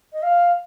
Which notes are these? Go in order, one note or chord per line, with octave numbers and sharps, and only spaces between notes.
D#5
F5